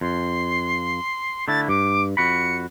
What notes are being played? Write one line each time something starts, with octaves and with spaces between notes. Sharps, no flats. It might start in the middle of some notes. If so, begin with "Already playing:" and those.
F2 C6
D3 A3 E4 A6
G2 D6
F2 F#4 B5 C#7